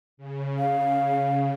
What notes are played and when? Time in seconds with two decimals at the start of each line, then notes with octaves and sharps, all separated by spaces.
0.17 C#3
0.59 F5